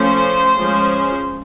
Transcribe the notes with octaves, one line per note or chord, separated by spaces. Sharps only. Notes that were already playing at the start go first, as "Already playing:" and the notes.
Already playing: F3 A3 C#4 C5
F3 G#3 C#4